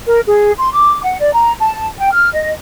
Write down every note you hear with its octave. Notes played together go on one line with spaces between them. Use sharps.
A#4
G#4
C6
D6
F#5
D5
A#5
A5
G5
F6
D#5